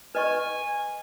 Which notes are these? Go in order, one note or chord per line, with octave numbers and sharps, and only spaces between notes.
B4 D#5 G#5 C#6